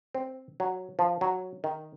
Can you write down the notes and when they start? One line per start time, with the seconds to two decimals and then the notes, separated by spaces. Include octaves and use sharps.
0.15 C4
0.60 F#3
0.99 F3
1.21 F#3
1.64 D#3